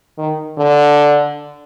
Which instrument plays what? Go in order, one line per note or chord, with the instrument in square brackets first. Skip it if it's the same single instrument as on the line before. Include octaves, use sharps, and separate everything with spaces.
[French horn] D#3
D3